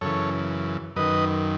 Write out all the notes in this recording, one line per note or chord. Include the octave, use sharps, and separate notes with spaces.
F#2 C#3 E3 A4 C#5
F#2 D#3 B4 D#5